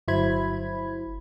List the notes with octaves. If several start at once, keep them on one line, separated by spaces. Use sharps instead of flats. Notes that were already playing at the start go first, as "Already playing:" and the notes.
G1 F#3 E4 C5 B5 G#6